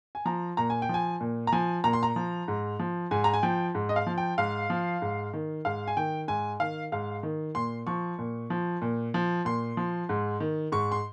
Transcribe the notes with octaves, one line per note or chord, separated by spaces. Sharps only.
G#5
F3 A#5
A#2 A#5
G#5
G5
F3 G#5
A#2
A#5
F3 G#5
A#2 A#5
C6
A#5
F3
G#2
F3
G#2 G#5
A#5
G#5
F3 G5
G#2
D#5
F5
F3
G5
G#2 F5
F3
G#2
D#3
G#2 F5
G#5
D#3 G5
G#2 G#5
D#3 F5
G#2 F5
D#3
A#2 C6
F3 C#6
A#2
F3
A#2
F3
A#2 C6
F3
G#2
D#3
G#2 C#6
C6